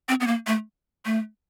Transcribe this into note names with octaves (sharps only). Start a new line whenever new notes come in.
C4
B3
A#3
A3
A3